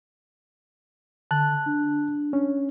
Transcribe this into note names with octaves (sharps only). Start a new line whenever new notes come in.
D3 A5 F#6
D4
C#4